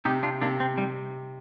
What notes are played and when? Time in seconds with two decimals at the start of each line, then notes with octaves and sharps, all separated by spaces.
0.05 C3 D#4 G4
0.23 D4 F4
0.42 C3 A#3 D4
0.60 C4
0.78 C3 G3